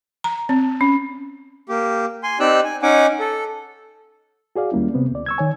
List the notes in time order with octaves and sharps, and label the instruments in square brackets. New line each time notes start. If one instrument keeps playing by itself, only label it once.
[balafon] A#5
C4
C#4
[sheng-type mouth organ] A#3 G4
G#5 C6
C4 D#4 G4 D5 E6 F#6
G#5
C#4 D#4 F#5 G#5 D6
A4
[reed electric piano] F#4 G#4 D5 F5
D#2 G3 A#3 C#4 E4
C3 B3 C4
D2 D5
C#6 E6 G#6
D#3 C#5 G#5